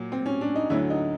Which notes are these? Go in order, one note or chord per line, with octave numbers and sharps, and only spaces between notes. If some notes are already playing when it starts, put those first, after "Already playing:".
Already playing: A#2 F#3
C4
C#4
D4
D#4
D2 D3 F#3 E4
D#4